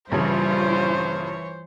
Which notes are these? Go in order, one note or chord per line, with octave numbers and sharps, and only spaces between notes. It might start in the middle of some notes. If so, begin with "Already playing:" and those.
A#1 G2 C#3 E3 G3 F4 C5 C#5